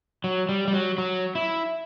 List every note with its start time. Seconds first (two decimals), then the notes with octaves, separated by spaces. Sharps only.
0.24 F#3
0.49 G3
0.68 G3
0.73 F#3
0.98 F#3
1.35 E4